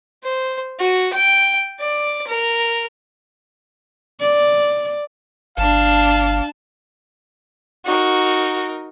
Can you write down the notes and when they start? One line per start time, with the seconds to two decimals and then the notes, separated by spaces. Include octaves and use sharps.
0.24 C5
0.80 F#4
1.13 G5
1.80 D5
2.27 A#4
4.20 D5
5.57 G1 D4 F5 A5
7.86 D#4 F#4 A#4